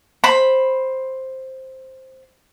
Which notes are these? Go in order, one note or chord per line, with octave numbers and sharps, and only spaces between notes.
C5 B5